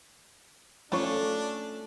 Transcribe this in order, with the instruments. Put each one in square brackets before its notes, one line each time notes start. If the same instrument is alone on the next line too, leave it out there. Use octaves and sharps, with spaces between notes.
[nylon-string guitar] A3 C#4 F4 [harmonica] D4 [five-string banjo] A4 C#5